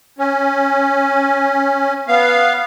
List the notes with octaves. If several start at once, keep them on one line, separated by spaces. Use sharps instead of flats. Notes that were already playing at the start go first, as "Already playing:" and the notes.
C#4
B3 F5